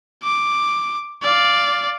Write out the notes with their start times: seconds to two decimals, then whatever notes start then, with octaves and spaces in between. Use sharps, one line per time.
0.23 D6
1.23 D5 F5